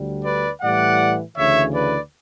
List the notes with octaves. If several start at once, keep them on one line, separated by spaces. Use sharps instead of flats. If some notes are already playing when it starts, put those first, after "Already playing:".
Already playing: D2 D3 G3
B4 D5
A2 E3 G3 D5 F#5
D2 C#3 E3 C#5 E5
B4 D5